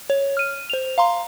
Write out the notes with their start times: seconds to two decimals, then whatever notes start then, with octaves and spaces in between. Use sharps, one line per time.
0.10 C#5
0.37 F6 D#7
0.70 C5 F7
0.98 F5 A#5 C6